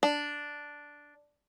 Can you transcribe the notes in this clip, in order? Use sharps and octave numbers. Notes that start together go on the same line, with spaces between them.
D4